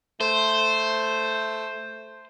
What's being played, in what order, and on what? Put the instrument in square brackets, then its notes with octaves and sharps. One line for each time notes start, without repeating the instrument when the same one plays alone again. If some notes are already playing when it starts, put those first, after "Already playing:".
[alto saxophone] A3 [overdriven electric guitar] C5